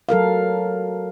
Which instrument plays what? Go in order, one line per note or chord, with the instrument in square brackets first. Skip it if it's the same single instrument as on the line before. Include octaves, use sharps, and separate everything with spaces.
[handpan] F#3 A4 A#4 F5